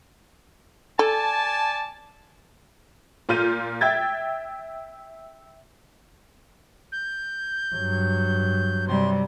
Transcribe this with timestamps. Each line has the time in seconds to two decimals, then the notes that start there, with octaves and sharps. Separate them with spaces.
0.99 A4 D5 G#5 A5
3.29 A#2 F4 F6 G6 D#7
3.81 E5 G5 G#6 A6
6.92 G6
7.75 G2 F#3
8.88 C3 G3 C6